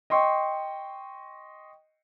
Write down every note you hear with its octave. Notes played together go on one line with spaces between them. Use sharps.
D#5 G5 C6 C#6